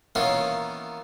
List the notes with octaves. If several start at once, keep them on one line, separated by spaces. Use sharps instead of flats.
D#3 E3 A#3 B3 C#4 F4